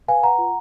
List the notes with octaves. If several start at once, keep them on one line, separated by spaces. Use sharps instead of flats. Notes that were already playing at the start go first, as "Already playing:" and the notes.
B4 F5 G#5
B4 F#5 A#5
F4